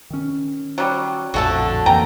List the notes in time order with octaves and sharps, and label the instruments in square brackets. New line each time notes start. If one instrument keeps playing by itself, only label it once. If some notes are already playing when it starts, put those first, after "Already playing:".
[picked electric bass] D#3 C#4
[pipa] F#3 G3
[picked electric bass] A#1 F2 A2 [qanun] D3 A3 A5 [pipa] F#4 A4
[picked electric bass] F2 E3 A#3 [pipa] G5 A#5